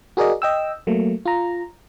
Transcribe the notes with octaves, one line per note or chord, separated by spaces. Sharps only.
F#4 G#4 A#4 D5 D#5
D#5 G5 E6
F#3 A3 A#3
F4 A#5